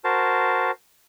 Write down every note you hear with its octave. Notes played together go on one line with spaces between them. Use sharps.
F#4 A#4 C5 A5